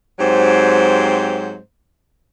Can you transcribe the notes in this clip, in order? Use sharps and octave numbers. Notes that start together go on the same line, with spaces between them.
G#2 F#3 C4 G4 C5